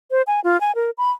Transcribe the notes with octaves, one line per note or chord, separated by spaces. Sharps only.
C5
G#5
F4
G#5
A#4
B5